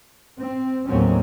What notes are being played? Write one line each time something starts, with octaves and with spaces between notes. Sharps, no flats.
C4
D#2 A2 F#3 C4 C#4